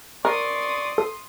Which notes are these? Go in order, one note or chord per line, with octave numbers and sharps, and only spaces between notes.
A#4 D5 C6 C#6 D#6
A4